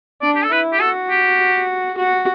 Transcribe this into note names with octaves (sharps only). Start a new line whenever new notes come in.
D4 D5
G4
A4
E4 B4
G4
F#4 A4
G4
F#4